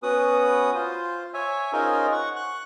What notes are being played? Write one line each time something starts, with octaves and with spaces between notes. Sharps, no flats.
B3 C#4 F#4 B4 D#6
F4 C5
C#5 E5 G#5
C#4 D#4 F4 G#4 A#4 C5
F#5 C#6
C#6 F#6